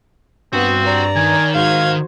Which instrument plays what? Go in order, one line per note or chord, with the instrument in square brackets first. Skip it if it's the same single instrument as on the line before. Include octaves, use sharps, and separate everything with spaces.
[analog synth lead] G2 [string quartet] B3 [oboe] C4 [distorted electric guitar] F#4
[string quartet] D5 A#5
[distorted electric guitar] D#3 [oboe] G#5
[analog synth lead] G#2 [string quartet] F#4 C5 G#6 [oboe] F5